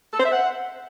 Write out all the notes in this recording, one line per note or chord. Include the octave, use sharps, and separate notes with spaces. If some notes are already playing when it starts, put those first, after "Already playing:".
A4
C5
E5
F#5